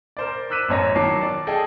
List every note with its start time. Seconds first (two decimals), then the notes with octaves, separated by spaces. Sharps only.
0.17 A#4 C5 D5
0.50 D6 E6 F#6 B6 D#7 E7
0.68 A1 F#2 C#5 A#6
0.95 D#3 F#3 A5 D6 C7
1.21 D5
1.47 G#4 A4 D#5 G5